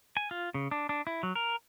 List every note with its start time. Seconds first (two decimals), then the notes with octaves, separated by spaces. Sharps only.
0.17 G#5
0.31 F4
0.54 C#3
0.71 D4
0.89 D4
1.07 E4
1.23 F#3
1.35 A#4